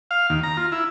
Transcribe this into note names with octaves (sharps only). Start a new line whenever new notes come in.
F5
D#2
A#5
F4
E4